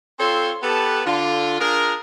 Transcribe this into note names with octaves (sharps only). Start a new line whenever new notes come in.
C4 F4 A4 C#5 C6
B3 G4 A4 B4 A5
D3 F4
D4 F4 G#4 A#4